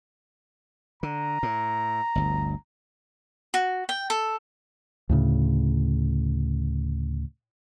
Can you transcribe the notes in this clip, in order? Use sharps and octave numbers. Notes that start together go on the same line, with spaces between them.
D3 A#5
A2
G1 D2
F#4
G5
A4
D2 A2 C#3